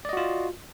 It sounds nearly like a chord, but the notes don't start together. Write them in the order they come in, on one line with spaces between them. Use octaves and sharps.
D5 D#5 F#4 F4